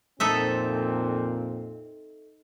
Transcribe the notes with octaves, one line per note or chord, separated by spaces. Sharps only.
F2 A#2 C4 D#4 A4 E5